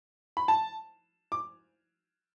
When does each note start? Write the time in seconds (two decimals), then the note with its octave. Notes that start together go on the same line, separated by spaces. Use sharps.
0.37 B5
0.48 A5
1.32 D6